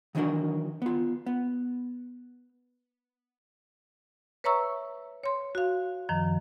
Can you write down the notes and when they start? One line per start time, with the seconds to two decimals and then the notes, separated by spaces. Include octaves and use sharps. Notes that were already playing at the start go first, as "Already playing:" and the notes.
0.15 D#3 E3 F#3 D4 F#4 A#4
0.82 B3 F4
1.26 B3
4.44 B4 C#5 E5 A#5 C#6 E6
5.23 C#5 C6
5.55 F#4 F5
6.09 F#2 D#3 F3